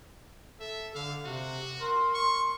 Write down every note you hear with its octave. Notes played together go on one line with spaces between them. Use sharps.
A4 E5
D3 F5
C3 F#4
A#4 C6
C#6